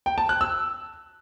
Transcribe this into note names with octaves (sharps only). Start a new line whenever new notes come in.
G5
A5
F#6
E6